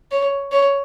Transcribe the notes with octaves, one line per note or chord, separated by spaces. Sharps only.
C#5
C#5